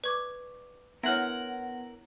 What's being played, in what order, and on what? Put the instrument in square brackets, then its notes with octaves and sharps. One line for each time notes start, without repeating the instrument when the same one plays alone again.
[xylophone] B4 G#6 [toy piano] D5 C#6 D6
[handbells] B3 [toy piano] D4 E4 C#5 [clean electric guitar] A#4 F#5 [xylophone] E5 F6